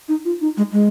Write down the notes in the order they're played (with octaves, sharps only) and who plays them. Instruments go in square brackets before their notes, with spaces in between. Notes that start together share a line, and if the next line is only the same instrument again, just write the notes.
[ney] D#4
F4
D#4
G#3
G#3